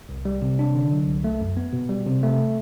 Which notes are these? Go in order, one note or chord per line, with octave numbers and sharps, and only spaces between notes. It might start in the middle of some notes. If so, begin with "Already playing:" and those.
C2
G3
C3
D4
D3
F#3
C2
A3
F#2
B3
B2
G3
C3
A3